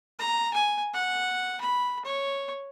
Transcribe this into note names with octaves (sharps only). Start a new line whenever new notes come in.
A#5
G#5
F#5
B5
C#5